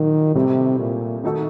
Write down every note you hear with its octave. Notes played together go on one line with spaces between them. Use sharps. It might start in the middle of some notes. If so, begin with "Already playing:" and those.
Already playing: A#2 D#3 F#3
A2 C3 G3 C4
A#2
D#3 A3 D#4 F#4 A4